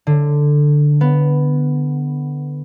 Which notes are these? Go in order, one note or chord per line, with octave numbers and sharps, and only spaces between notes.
D3
B3